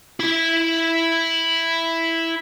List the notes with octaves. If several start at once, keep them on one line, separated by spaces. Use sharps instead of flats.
E4 B5